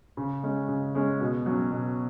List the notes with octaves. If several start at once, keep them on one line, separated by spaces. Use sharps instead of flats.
C#3
G#3 C#4
C#3
G#3 C#4
B2
F#3 C#4
B2